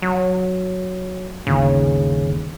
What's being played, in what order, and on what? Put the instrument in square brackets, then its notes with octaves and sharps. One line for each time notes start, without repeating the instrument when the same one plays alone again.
[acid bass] F#3
[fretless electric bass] G1 D#2 [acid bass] C#3